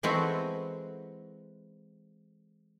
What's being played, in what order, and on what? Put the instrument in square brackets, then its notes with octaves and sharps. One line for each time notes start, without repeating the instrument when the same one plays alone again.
[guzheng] E3 G#3 B3 C4 F#4 A4